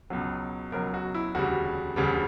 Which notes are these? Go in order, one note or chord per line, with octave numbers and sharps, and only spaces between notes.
C#2 B2 F#3
C#2 B2 F#3 A#4
F#4
E4
E1 D2 C#3 G3 F#4
E1 D2 C#3 G3